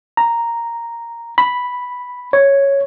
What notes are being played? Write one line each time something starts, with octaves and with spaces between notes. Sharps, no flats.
A#5
B5
C#5